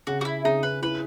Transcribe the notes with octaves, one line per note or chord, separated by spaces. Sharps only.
C#3 F#4
F#4
E4
C#3 D#4
B4
E4 B4